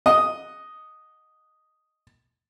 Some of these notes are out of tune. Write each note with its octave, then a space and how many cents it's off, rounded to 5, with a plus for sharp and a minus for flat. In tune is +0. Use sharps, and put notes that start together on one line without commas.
D#5 +0 F#5 +0